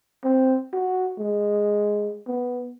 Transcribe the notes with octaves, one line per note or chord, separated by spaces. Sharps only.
C4
F#4
G#3
B3